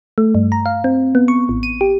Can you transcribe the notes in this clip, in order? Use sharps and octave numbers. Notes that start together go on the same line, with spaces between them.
A3
G2
A#5
F5
C4
B3
C#6
A1
D#7
G4